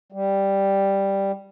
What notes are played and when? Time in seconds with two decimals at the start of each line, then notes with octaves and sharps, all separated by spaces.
0.12 G3